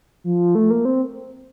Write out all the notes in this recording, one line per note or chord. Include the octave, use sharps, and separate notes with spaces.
F3
A3
A#3
C4